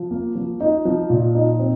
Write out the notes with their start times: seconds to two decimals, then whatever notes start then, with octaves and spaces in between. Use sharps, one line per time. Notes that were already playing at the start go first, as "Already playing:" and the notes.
Already playing: F3
0.11 A#3
0.35 F3
0.60 D#4
0.85 F3
1.10 A#2
1.35 D#4
1.59 C4